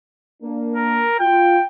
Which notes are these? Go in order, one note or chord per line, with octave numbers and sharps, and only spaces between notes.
A#3 D4
A#4
F4 G5